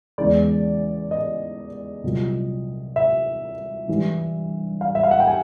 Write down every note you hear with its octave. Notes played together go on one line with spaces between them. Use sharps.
E2 C#3 E3 G#3 D5
D#5
C2 A#2 F#3
E5
G2 E3 G3
F5
E5
F5
F#5
G5
G#5